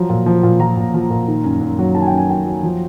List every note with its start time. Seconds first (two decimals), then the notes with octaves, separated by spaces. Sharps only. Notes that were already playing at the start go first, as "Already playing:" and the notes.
Already playing: F3 F#3 A#5
0.09 A#2
0.26 F3
0.43 A#2
0.60 F3 A#5
0.77 A#2
0.94 F3
1.10 A#2
1.28 D#3
1.44 F#2
1.61 F#2
1.79 F#3
1.95 D#3 A5
2.02 G#5
2.07 G5
2.12 F#2
2.18 G#5
2.29 F#2 G5
2.46 F#3
2.63 F3